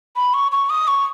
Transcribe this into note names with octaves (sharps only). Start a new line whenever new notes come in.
B5
C#6
C#6
D#6
C#6